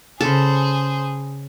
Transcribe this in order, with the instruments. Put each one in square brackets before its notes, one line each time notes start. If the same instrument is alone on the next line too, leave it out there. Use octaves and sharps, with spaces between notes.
[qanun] C#3 A4 [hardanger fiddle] G#4 C5